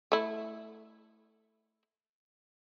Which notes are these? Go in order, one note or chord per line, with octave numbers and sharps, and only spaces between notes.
A3 E4